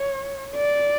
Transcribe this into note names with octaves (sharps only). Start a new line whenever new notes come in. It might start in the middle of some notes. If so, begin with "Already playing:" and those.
Already playing: C#5
D5